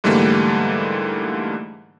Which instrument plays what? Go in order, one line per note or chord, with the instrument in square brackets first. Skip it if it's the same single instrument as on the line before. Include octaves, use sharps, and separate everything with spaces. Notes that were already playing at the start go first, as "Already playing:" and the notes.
[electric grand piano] G#2 D3 E3 G3 A3 A#3